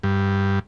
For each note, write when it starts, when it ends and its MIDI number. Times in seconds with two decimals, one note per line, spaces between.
0.03 0.59 43